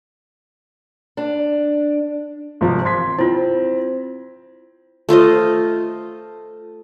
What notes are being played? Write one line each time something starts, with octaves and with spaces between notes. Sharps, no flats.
D4
G#1 C3 F3
C6 G#6 B6
C4 E4 F4
A3 F4 C5 D#5